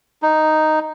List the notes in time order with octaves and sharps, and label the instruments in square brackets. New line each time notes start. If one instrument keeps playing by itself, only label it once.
[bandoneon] D#4